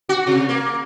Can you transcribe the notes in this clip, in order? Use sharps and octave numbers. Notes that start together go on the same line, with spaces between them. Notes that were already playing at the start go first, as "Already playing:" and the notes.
F#4
C3
A#3